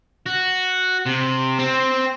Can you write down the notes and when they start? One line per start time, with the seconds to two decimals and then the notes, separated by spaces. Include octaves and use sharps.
0.26 F#4
1.06 C3
1.59 C4